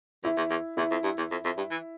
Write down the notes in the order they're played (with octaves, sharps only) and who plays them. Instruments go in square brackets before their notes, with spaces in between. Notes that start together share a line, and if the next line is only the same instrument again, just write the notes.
[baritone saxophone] E2 [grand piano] E4
[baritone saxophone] E2
E2
[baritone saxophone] E2 [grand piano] E4
[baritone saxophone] F2
G2
E2
F2
F2
G2
E3